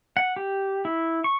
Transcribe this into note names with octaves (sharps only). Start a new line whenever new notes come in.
F#5
G4
E4
C#6